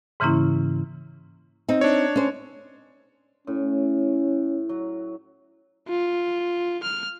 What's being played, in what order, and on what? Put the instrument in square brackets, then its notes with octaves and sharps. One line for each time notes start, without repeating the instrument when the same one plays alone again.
[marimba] G#2 C#3 E3 A#3 C#4 E4
[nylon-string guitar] C4 D#4
[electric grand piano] D4 C#5
[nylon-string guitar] C#4 C5
[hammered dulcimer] A2 [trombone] C#4
[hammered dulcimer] F#3
[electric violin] F4
F6